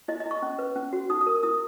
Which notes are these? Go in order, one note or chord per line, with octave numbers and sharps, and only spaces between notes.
E4 D#5
D#5
E4
C#6
C#4
B4
C#4
F#4
D#4 D#6
D#6
A#4
E4 D#6